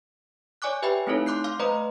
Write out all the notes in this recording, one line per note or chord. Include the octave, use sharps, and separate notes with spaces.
C#5 D5 G#5 C#6 D6 F#6
G4 B4 E5 G5 G#5 B5
A3 C4 D#4 E4 A4 C#5
C6 D6 F#6 G6 C7
F5 C6 D6 F6
A3 B4 C5 D#5 A#5